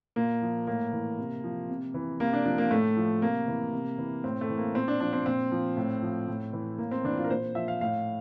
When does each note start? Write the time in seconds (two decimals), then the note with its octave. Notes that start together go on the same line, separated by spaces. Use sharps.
0.16 A#2 A#3
0.42 F3
0.67 A2 A#3
0.93 E3
1.18 C3
1.44 F3
1.69 C3
1.94 E3
2.20 C3 A#3
2.33 D4
2.46 F3 D4
2.58 A#3
2.71 A2 A3
2.97 F3
3.22 C3 A#3
3.48 E3
3.73 C3
3.98 E3
4.24 A2 C4
4.41 A3
4.50 E3
4.58 A#3
4.75 A#2 C4
4.88 D4
5.00 F3 D4
5.13 C4
5.26 A#2 C4
5.52 F3
5.77 A2
6.03 F3
6.28 A2
6.53 E3
6.78 A2 A#3
6.91 C4
7.04 E3 D4
7.17 F4
7.24 A#4
7.30 A#2 C5
7.55 F3 E5
7.68 F5
7.81 A2 F5